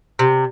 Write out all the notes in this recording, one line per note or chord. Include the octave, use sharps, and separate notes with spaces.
C3